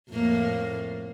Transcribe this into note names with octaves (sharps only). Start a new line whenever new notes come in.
F2 A2 A#3